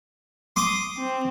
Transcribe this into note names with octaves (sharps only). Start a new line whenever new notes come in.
C6 D6 D#6
C4